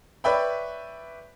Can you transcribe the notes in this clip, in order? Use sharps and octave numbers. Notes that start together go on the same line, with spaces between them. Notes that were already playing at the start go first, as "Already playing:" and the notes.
B4 C#5 D5 E5 G5 B5